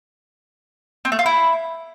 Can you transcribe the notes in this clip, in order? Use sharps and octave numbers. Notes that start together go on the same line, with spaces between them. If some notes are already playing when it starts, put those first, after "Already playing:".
C4
A3
F4
E4